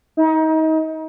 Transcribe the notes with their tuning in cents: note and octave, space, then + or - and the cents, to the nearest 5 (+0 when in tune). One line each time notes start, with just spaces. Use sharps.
D#4 +30